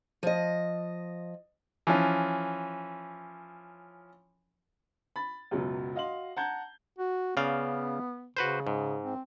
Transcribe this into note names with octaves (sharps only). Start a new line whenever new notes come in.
F3 D#5
E3 F3 C#4
B5 A6
C#2 F#2 B2 F#3
F#4 D#5 F5 C6 F#7
F#5 A5 A#5 G6 G#6
F#4
C#3 B3 D5 F5
C#3 F#4 B4 C5
G#2
C4